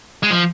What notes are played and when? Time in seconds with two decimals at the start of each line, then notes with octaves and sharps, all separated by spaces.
0.23 G#3
0.31 F3